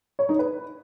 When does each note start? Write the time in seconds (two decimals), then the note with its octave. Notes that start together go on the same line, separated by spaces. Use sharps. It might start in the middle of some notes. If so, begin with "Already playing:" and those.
0.19 C#5
0.29 D#4
0.39 B4